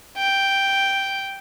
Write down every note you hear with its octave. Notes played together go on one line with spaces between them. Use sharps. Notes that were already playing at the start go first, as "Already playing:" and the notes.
G5